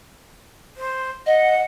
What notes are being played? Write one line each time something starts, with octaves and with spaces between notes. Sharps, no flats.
C5
D#5 F#5